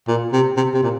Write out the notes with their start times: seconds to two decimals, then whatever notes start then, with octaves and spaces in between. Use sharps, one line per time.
0.08 A#2
0.33 C3
0.57 C3
0.74 C3
0.83 A#2